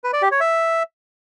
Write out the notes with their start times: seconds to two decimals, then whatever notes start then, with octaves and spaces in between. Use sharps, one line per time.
0.04 B4
0.13 D5
0.22 G4
0.31 C#5
0.40 E5